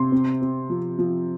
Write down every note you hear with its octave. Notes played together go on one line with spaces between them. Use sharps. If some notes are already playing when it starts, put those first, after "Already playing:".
Already playing: C3 C6
C4
C4
F3
F3